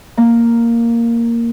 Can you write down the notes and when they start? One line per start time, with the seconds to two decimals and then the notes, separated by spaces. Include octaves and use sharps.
0.17 A#3